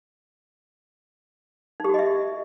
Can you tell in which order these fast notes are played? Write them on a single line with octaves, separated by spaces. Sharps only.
D#4 G4 F#4 D#5 E5